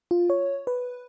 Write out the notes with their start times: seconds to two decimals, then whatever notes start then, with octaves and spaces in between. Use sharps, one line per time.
0.11 F4
0.30 C#5
0.67 B4